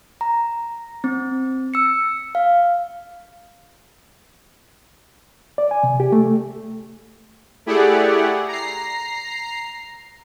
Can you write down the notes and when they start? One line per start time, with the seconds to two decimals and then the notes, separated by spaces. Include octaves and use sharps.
0.21 A#5
1.04 C4
1.74 E6 C#7
2.35 F5
5.58 D5
5.71 G#5
5.83 C3
6.00 G4
6.12 A3
7.66 A3 E4 G4 G#4 D5 F#5
8.48 A#5 C7